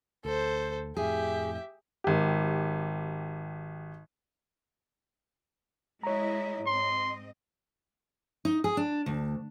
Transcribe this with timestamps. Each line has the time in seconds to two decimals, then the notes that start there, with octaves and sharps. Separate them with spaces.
0.25 D2 A4 C5
0.97 F2 A2 G4 G#4 E5
2.04 G#1 G4
6.03 G#3 E4 C#5 D#5 A#5
6.66 G#2 C4 D#5 C6
8.45 D#4
8.64 G#4
8.77 D4
9.06 D2